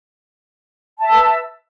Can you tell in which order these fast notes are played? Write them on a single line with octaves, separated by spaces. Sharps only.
A5 E5 E6 B4